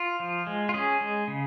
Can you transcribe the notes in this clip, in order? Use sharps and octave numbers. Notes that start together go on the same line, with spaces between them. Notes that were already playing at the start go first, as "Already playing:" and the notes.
Already playing: F4
F3
G#3
F4
C#4 G#4
G#3
C#3